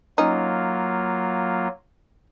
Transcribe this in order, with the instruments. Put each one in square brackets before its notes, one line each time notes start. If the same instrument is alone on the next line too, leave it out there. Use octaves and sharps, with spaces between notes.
[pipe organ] F#3 A#3 F4 [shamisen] C#4 D#4